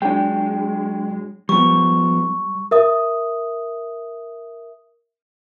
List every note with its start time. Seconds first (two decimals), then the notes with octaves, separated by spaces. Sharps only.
0.02 F#3 G#3 D4 G5
1.49 F3 G3 B3 C#6
2.71 A#4 E5 D#6